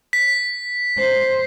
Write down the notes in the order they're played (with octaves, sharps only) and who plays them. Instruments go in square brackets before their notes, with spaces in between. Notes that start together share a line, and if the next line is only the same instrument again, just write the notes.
[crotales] B6
[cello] C5